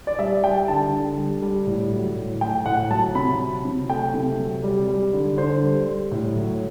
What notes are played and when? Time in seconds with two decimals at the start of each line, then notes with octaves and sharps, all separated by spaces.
0.07 D5
0.19 G3 E5
0.43 G3 G5
0.68 D3 A5
0.92 D3
1.17 G3
1.42 G3
1.67 A2
1.92 F#3
2.16 A2
2.41 A3 G5
2.66 A2 F#5
2.91 F#3 A5
3.15 C3 B5
3.40 F#3
3.65 C3
3.89 A3 G5
4.14 C3
4.39 F#3
4.63 G3
4.88 G3
5.13 D3
5.37 D3 C5
5.63 G3
5.87 G3
6.11 A2
6.36 F#3